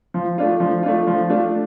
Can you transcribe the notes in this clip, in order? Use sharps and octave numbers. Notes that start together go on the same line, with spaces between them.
F3
A3 D4 F4
F3
A3 D4 F4
F3
A3 D4 F4